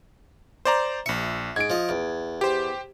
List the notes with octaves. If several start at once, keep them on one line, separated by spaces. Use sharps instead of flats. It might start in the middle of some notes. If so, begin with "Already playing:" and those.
C5 D5 A#5
A#1 E5 C#7
G#2 G#6 D7
F3 D#5
E2
G4 C5